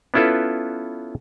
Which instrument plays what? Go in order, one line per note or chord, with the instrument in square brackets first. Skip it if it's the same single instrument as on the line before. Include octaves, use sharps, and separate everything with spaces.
[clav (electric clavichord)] B3 C#4 E4 F4 A4 B4